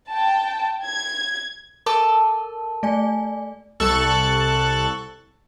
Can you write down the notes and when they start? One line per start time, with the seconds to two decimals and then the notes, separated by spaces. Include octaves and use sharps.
0.10 G5 A5
0.85 G#6
1.86 A4 A#4 A5 D6
2.83 A3 D5 G#5
3.80 C2 A4 C#6 F#6 A6